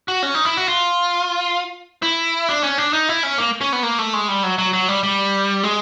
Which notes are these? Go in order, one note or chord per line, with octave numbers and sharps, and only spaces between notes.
F#4
C#4
D#4
E4
F#4
F4
E4
D4
C#4
D4
D#4
E4
C#4
A#3
C#4
B3
A#3
A3
G#3
G3
F#3
F#3
F#3
G3
G3
G#3